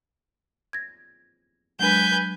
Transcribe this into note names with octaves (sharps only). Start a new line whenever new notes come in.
G#6 A#6
F#3 G#3 D4 B4 G#5 G6